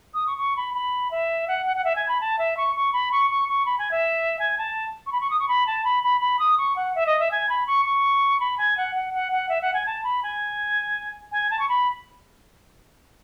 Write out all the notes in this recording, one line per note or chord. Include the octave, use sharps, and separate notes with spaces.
D#6
C#6
C#6
B5
B5
E5
F#5
F#5
F#5
E5
G#5
B5
A5
E5
C#6
C#6
B5
C#6
C#6
C#6
B5
G#5
E5
G#5
A5
C#6
B5
C#6
D#6
C#6
B5
A5
B5
B5
B5
D#6
C#6
F#5
E5
D#5
E5
G#5
B5
C#6
C#6
B5
G#5
F#5
F#5
F#5
F#5
E5
F#5
G#5
A5
B5
G#5
G#5
A5
C#6
B5